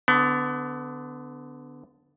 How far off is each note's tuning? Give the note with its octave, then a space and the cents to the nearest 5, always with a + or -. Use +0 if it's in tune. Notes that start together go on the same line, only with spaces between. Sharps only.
D3 +0 B3 +25